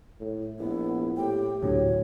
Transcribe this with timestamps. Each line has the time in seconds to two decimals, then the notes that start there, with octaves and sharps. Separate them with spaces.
0.20 A2
0.59 A#1 B3 E4
1.17 A2 G4 G5
1.62 D2 A2 D3 F#3 C#5